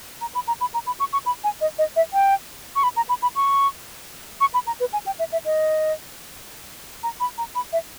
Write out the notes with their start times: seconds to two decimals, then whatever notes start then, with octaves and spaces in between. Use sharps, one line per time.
0.21 A#5
0.35 B5
0.48 A#5
0.61 B5
0.74 A#5
0.87 B5
1.00 C#6
1.13 C#6
1.26 B5
1.44 G#5
1.61 D#5
1.78 D#5
1.96 E5
2.13 G5
2.76 C#6
2.83 B5
2.97 A#5
3.09 B5
3.22 B5
3.36 C#6
4.41 C#6
4.54 B5
4.67 A#5
4.80 B4
4.93 G#5
5.06 G5
5.19 E5
5.32 E5
5.46 D#5
7.03 A#5
7.20 B5
7.38 A#5
7.55 B5
7.73 E5